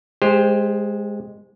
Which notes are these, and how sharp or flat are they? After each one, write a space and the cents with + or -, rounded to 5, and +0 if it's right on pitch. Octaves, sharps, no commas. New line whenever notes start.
G#3 +0 G4 +30 C5 +0